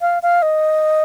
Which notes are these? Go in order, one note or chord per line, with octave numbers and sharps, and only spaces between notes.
F5
F5
D#5